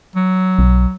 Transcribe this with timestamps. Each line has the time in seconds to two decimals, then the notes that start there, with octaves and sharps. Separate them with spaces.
0.16 F#3
0.59 B1